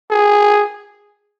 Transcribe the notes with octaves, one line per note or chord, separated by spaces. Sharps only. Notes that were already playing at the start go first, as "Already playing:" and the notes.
G#4